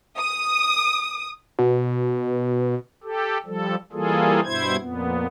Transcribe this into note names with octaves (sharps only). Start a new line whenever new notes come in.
D#6
B2
G4 A4
F3 G3 A4
E3 G3 A#3 F4 G#4 A4
G2 B2 E4 C5 G#6
F2 A#2 B3